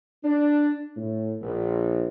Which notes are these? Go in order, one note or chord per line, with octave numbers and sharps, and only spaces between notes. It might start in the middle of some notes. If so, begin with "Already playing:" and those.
D4
A2
A#1